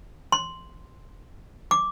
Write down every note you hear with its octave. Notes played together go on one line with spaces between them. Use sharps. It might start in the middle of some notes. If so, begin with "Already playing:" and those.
C6
D6